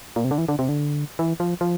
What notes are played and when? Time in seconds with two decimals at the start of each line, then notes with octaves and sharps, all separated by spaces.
0.16 A#2
0.24 C3
0.31 D3
0.38 E3
0.48 D3
0.59 C3
0.69 D3
1.19 E3
1.40 F3
1.61 F3